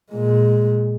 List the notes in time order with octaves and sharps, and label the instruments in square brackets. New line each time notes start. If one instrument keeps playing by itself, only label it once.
[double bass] A#2 G#3